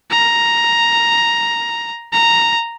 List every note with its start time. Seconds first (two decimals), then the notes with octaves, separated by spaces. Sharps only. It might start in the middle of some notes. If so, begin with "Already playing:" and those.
0.11 A#5
2.12 A#5